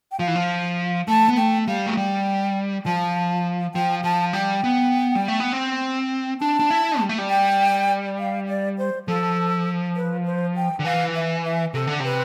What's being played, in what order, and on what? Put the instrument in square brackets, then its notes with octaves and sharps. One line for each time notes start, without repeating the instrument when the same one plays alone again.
[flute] G5
[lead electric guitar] F3 [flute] F5
[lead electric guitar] E3
F3
[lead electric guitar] A3 [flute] A5
[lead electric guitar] B3
[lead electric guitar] A3 [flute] G5
[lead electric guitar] G3 [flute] F5
[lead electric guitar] A3
[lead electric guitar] G3 [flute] G5
[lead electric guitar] F3 [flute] A5
[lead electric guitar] F3 [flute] G5
[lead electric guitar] F3 [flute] A5
[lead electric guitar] G3 [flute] G5
[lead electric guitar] B3
G3
A3
B3
C4
[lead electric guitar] D4 [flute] A5
[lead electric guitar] D4
E4
G3
A3
G3
[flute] G5
F5
D5
C5
[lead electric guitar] F3 [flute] A4
[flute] B4
C5
G5
[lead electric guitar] D3
[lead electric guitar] E3 [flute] F5
[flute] E5
E5
[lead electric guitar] C3 [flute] A4
[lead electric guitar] D3
[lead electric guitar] C3 [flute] B4